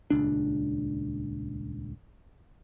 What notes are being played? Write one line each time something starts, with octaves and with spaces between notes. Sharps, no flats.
D#1 G#1 C#2 D4